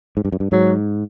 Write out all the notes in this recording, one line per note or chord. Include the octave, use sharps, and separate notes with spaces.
G#2
G2
F#2
G2
G#2 F#3